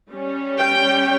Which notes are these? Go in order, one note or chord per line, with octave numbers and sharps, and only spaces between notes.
G3 C#4
G5